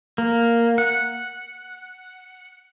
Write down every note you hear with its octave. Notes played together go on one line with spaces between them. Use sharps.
A#3
F#5